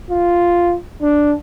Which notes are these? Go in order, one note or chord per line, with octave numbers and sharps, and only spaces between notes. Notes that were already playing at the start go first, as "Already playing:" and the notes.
F4
D4